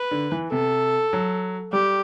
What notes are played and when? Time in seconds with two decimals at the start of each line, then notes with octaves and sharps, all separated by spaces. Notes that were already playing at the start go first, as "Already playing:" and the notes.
Already playing: B4
0.11 D3
0.32 E3
0.52 C3 A4
1.13 F#3
1.73 G3 G4